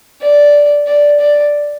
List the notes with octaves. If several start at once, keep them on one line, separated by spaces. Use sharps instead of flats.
D5
D5
D5